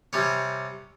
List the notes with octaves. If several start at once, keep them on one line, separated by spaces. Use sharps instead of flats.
C3 G3 C#4